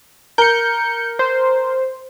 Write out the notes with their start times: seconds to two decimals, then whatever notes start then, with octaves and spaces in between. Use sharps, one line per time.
0.38 A#4 G6 C#7
1.19 C5